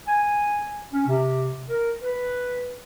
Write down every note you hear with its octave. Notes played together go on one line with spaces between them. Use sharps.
G#5
C#4
C3
A#4
B4